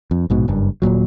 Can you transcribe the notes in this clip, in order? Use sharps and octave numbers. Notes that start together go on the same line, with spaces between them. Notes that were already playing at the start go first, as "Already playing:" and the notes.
F2
A#1 G#2 B2
F#1 G2
D#1 C#2 A#2 F#3